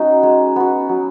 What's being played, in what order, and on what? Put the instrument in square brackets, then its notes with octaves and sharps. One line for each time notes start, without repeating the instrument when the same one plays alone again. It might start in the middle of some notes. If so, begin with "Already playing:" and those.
Already playing: [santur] F#3 B3 C#4 D#4 F#4
G#3
B3 F#4
F#3